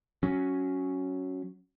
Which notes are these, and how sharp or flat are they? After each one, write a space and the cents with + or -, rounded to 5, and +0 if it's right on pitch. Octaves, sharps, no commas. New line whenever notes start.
F#3 +0 C#4 +0